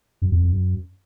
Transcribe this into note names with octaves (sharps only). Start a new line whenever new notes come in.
F#2
F2
F2
F#2